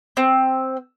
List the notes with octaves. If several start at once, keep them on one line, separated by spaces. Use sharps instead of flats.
C4